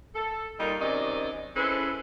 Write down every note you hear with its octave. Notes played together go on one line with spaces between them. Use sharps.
A4
G3 A#3 D#4 F4
F#2 C3 D#3 D5 D#5
C#4 E4 G#4 A4 B4 C5